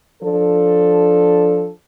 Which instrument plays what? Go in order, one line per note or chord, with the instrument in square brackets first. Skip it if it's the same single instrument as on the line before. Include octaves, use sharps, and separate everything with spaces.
[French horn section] F3 D4 A4